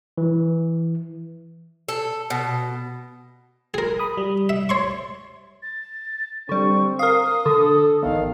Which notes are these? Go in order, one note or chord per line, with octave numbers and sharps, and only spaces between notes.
E3
A4
B2
G#4 A#4
B5 D#6
G3
E5
C#5 C6 C#6
A6
D3 G3 C4 C#6
A#4 F5 D#6
D3 A4
A1 E2 D#3 F5